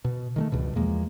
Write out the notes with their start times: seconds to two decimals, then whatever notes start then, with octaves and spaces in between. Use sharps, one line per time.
0.05 B2
0.36 D#3 G#3 A3
0.52 C#2 G2 B2
0.75 E2 F3 G#3 A#3